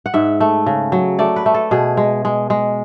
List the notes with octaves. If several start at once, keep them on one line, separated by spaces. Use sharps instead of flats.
F#5
G#2 E5
A3
C#3
F#3
A3 D5
B4
A3
A4
B2 G#4
G#3
G#3
G#3